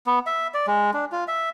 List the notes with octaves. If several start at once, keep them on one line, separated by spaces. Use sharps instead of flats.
B3
E5
D5
G#3
D4
F4
E5